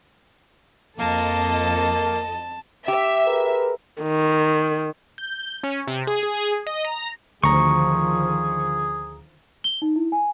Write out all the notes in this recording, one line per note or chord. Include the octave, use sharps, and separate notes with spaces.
F2 A#3 A4 D#5 A5
G4 E5
G#4 A#4 B4
D#3
G6
C#4
C3
G#4
G#4
D#5
A#5
D2 D3 D#3 F3 G#4 A#5 C#6
G7
D#4
E4
G#5